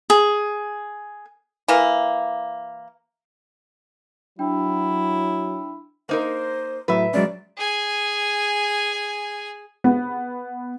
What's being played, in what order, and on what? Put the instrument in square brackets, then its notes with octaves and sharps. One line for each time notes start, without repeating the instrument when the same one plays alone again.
[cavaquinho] G#4
[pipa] E3 A#3
[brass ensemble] F#3 [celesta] D4 G5 [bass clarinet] E4
[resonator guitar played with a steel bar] A#3 D#4 A#4 [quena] C5
[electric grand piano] A2 F#3 [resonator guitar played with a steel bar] B4 E5
[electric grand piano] F#3 G#3 C#4 [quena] D5
[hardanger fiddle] G#4 G#5
[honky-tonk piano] B3